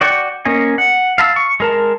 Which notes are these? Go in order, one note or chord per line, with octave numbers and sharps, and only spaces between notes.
F#4 D5 F#5 G5 C#6
A#3 C#4 D#5 G#5
F#5
F5 A5 B5 E6
C#6
G#3 A#4 A5